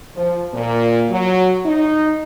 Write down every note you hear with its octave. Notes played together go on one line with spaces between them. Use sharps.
F3
A#2
F#3
D#4